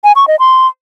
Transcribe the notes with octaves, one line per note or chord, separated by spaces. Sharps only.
G#5
C#6
D#5
C6